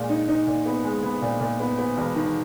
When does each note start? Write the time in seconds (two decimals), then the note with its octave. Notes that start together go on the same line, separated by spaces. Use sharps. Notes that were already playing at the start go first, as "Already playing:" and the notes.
Already playing: A#2 G#3
0.09 D#4
0.28 D#4
0.47 A#2
0.66 B3
0.84 G#3
1.03 B3
1.22 A#2
1.40 A#2
1.60 B3
1.78 B3
1.97 E1
2.15 D#3